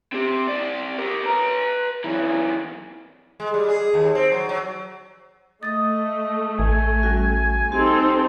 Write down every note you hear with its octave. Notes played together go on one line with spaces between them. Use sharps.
C4 G4
C4 D5
G4 A#4
B4 A#5
F#2 E3
G#3
G3
G#4
D#2
C4
F#3
F#3
A3 D#5 D#6 A6
A1 G#5
G3 C#4 F#4
C4 D#4 G4 A4